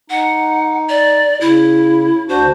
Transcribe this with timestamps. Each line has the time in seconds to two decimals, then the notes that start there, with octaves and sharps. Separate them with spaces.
0.10 D#4 F#5
0.89 D5
1.41 C#3 E4
2.29 D2 D4 F#4 C5